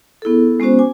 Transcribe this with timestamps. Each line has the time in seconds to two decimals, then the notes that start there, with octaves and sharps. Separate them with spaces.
0.22 B3 E4 G#4 A4
0.60 G#3 B3 C#4 F#4 C5
0.79 G#5 D6